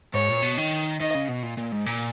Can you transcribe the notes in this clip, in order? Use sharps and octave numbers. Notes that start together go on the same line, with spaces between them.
G#2 C#5
A#2
B2
D#3
D#3 D#5
C#3
B2
A#2
A#2
G#2
A#2